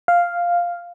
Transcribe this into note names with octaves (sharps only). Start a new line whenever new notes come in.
F5